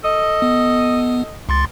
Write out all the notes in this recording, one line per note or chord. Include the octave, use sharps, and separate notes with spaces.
A4 D#5
B3
C#2 C6 A6